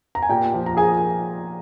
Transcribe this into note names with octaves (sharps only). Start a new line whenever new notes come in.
A#5
G#5
A#2 G4 G5
F3
A#5
F3 G#4 G#5